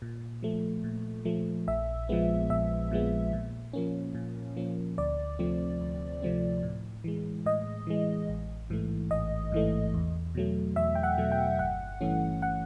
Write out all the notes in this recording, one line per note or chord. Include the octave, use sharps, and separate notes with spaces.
A#2
F3 A3
A#2
F3 A3
A#1 E5
A#2 F3 G#3 B3
A#1 E5
A#2 F3 G#3 B3
A#2
F3 A#3 C#4
A#2
F3 A#3 C#4
D2 D5
C3 F3 A3 C4
D2
C3 F3 A3 C4
A2
E3 G#3
A2 D#5
E3 G#3
A1
G#2 E3 A3
A1 D#5
G#2 E3 A3
E2
B2 F#3 A3
E2 E5
G5
F#5
B2 F#3 A3
G5
G1 F#5
G2 E3 A3 C#4
F#5